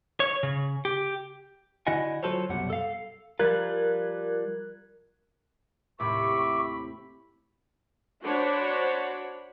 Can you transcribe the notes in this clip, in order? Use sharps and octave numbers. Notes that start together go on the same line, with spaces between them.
C#5
C#3
G4
D3 E4 F#4 D#5 F#5 G#5
F#3 F4 F#4 A4 C5 C#5
C2 F#2 B2 G3 F#5
A4 F5
F3 G3 F4 A#4 F#6 G#6
D#2 A2 C3 E5 B5 C#6 D6
D4 F#4 C5 C#5 F#5 B5